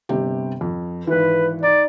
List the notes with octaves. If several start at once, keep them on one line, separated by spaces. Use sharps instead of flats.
G1 C3 G4
F2
G#1 E3 B4
D#4 D5